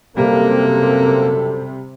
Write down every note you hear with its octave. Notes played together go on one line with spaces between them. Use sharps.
F#2 C3 G3 A#3 C4 A4